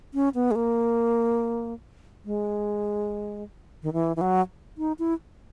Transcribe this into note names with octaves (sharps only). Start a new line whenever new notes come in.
C#4
B3
G#3
A#3
G#3
D#3
E3
E3
F#3
D#4
E4